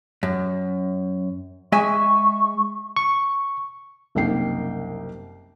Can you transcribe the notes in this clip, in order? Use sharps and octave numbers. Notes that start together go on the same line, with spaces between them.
F#2
G#3 E5 G#5 C#6
C#6
F#1 C2 A#3 D#4 G5 C7